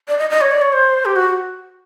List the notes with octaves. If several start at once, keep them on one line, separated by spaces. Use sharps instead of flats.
D5
D#5
D#5
C#5
D5
C#5
C5
G4
F#4